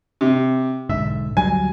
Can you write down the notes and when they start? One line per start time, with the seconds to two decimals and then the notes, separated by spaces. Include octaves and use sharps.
0.21 C3
0.89 B1 G#2 D3 E5
1.37 D2 F#3 G3 G#5